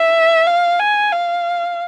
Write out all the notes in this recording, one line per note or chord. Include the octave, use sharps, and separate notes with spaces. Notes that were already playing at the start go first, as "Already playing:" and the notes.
Already playing: E5
F5
G#5
F5